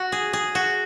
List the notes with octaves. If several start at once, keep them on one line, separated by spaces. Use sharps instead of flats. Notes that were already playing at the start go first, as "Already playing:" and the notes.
Already playing: F#4
G#4
G#4
F#4